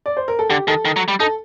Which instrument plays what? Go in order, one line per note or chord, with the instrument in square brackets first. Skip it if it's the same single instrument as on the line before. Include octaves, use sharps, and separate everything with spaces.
[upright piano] D5
C5
A#4
A4
[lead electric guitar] D3 [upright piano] G4
[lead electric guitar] D#3 [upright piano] A4
[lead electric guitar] D#3
F#3
G3
[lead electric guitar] D#4 [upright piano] A4